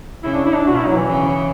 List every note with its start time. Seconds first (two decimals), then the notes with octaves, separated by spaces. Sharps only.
0.23 C#3 E4
0.33 D4
0.45 E4
0.55 D4
0.66 B2 F#4
0.77 E4
0.87 F#3
0.97 E3
1.08 C#3